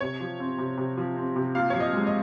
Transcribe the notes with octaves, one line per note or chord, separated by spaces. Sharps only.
C3 C#5
F3
C4
C3
C3
F3
C4
C3
A#2 F5
F3 C#5
D#5
G#3
D#5